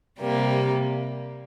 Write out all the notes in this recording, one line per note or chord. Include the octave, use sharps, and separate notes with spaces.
C3 G3 A#3